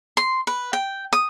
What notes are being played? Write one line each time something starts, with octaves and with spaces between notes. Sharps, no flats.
C6
B4
G5
D#6